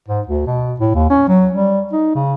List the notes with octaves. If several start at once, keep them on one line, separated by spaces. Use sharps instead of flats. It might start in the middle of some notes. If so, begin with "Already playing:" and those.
G#2
D2
B2
A2
D#2
C#4
F#3
G3
D#4
C#3